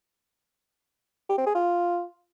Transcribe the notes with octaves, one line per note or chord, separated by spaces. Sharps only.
G4
C4
G#4
F4